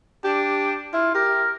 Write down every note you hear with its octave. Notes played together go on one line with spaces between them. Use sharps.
D4 G4
E4 F4
G4 A#4